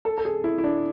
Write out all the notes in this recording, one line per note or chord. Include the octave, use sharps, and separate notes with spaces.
A4
A4
G#4
E4
E4
D4